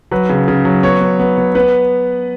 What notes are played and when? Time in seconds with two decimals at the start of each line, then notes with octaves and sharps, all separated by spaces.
0.11 F#3 B4
0.29 C#3
0.48 C#3
0.65 F#3
0.83 B3 C#5
1.01 B3
1.19 B3
1.38 B3
1.55 B3 B4